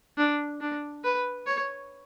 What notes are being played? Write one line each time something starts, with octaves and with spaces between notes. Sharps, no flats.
D4
D4
B4
C#5